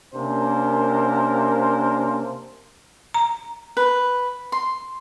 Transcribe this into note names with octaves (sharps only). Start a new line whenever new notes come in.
C3 A#3 C#4 D4 A#4 C5
A#5
B4
C6